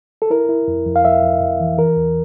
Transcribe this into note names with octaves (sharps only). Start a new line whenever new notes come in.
A4
E4 A#4
E4
F2
F2
F5
F2 E5
F2
F2
E3
E3 A#4
E2